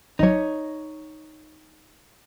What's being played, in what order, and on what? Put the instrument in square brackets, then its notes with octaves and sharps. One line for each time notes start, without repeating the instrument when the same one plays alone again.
[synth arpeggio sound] G#1 F#3 [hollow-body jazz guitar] D#4 C#5